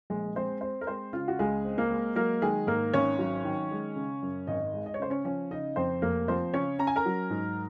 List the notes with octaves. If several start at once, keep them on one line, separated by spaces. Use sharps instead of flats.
A#1 G#3 G#4
G#3 C4 C5
C4 C5
A#4
G#3 C4 C5
C#3 F4 F5
F#4
C#2 G#3 G#4
C4
A#3 A#4
G#3
F#3 A#3 A#4
D#3 G#3 G#4
G#2 A#3 A#4
G#1 C#4 C#5
F#3
D#3
G#3
C#3
F#2
G#1 D#4 D#5
G#3
D#5
C#5
C#3 C5
C#4 C#5
F3 C#4 C#5
C#3 D#4 D#5
F2 C4 C5
F1 A#3 A#4
F3 C4 C5
C#3 C#4 C#5
C#4 A#5
G#5
A#4 A#5
F#3
G#2